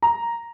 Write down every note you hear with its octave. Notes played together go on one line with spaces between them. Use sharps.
A#5